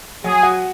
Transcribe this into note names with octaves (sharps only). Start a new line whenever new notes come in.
F#3 G#4
F#4